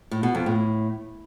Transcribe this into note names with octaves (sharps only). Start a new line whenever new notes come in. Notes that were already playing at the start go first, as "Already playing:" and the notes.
A2
B2
F2
A2